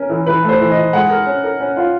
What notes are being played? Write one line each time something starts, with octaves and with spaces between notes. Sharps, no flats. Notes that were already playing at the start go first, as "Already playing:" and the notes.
Already playing: C#4 A#4
E3
E3 B4
A3
C5
E3
D#5
E3
G#3 F#5
A#4
C#4
A#4
C#4
F4